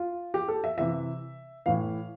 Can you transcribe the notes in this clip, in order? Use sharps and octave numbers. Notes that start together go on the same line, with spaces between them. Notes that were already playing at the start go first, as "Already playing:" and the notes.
Already playing: F4
G4
A4
E5
C3 E3 E5
A2 E3 F5